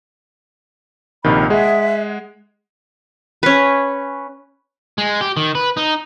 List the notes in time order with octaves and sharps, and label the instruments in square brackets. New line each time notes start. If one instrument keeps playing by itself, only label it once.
[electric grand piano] A#1 C3 D#3 [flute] B5
[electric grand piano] G#3 G#4 F#5 [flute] E5
[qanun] C#4 B4
[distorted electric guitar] G#3
G4
D#3
B4
D#4